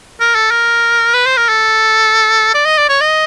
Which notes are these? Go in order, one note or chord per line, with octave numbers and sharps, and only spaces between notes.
A#4
A4
A#4
B4
C5
A#4
A4
D5
D#5
D5
C#5
D#5